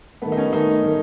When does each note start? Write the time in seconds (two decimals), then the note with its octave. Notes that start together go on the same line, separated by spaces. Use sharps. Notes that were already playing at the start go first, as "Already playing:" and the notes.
0.22 D#3 A3 B3
0.32 D#4
0.37 C#4
0.53 D#3 A3 D#4
0.84 D#3 A3